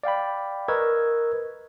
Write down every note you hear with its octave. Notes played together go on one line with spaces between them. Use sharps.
D5 F5 G5 B5
A#4 B4 D#5 C#6 E6 G#6